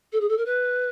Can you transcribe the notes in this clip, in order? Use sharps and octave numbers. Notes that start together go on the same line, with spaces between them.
A4
G#4
A4
A#4
B4